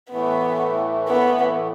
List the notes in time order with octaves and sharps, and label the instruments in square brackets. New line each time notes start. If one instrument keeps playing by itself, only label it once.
[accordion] A2 E3 A3 [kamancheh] B3
[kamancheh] B3